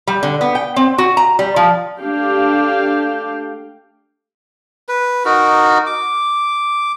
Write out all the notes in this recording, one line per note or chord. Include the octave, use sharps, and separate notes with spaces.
G3
D3
B3
G5
C4
F#4
A#5
G3
F3
A3 D4 G4 F5 G5
B4
D#4 F#4 A#4
D6